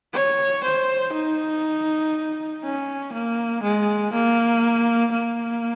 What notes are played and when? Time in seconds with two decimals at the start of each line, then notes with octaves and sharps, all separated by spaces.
0.13 C#5
0.64 C5
1.13 D#4
2.63 C#4
3.13 A#3
3.63 G#3
4.13 A#3
5.12 A#3